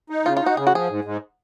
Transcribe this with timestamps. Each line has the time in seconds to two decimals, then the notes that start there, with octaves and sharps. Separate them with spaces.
0.10 D#4
0.25 C#3 F4
0.37 D#4 F4
0.46 F#4
0.57 C#3 G#4
0.67 F#4
0.73 F3 G#4
0.90 G#2
1.04 G#2